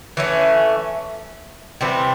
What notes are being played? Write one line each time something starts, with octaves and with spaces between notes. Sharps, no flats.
E3 A3 C#4
C3 E3 G3 C4